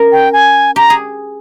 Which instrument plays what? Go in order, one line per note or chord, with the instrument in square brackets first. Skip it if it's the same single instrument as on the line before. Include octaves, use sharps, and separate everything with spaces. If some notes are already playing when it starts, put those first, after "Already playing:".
Already playing: [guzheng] C#4 A#4
[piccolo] G5
G#5
[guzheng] G4 [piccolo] A#5
[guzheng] G#4